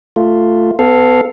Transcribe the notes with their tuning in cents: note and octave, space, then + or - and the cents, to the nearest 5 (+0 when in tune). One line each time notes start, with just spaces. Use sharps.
A3 +10 F4 +0
B3 +35 A4 +0 F5 +0